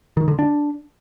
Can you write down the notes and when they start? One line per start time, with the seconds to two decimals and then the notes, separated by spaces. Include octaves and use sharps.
0.17 D#3
0.28 D3
0.39 D4